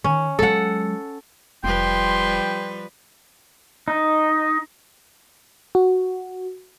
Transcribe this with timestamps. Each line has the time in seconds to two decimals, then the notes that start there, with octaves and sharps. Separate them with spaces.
0.04 D#3 C#4
0.39 F#3 G#3 A4 F#5
1.64 F1 F3 G3 B4 G5 C6
3.88 D#4
5.75 F#4